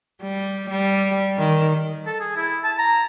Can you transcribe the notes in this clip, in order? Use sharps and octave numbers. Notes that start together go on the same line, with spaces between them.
G3
G3
D#3
A4
G#4
E4
A5
A#5